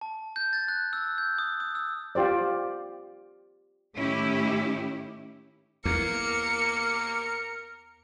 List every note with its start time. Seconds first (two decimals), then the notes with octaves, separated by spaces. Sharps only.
0.01 A5
0.36 G6
0.53 A6
0.68 F#6
0.93 E6
1.18 G6
1.38 D#6
1.60 D#6
1.75 E6
2.15 F4 G4 C5 D5
3.97 A2 D#3 C#4 E4 G4
5.85 E2 A#3 A#4 C#7